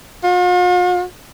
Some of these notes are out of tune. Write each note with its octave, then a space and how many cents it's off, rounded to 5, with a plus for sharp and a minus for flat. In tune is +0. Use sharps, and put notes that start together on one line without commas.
F4 +45